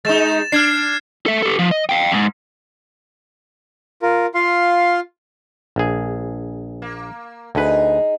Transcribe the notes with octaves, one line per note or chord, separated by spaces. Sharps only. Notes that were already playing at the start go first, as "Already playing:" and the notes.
G#3 D#4 A6 E7
D4 F6 G#6 C7
A4 E5
G4 A4
F3
D#5
F5 G5
F2 G#2
F4 A#4
F4 F5 C6
A#1 G#4
A#3
D2 D#4 G#4 B4